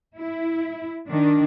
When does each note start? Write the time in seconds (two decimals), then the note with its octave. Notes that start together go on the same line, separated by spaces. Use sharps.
0.18 E4
1.09 D#3 D4